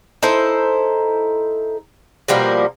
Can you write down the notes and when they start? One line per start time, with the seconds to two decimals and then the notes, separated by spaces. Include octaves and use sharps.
0.23 D#4 E4 A4 C5
2.28 B2 F3 G3 A#3